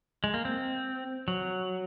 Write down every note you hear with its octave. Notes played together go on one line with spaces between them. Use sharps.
G#3
A#3
C4
F#3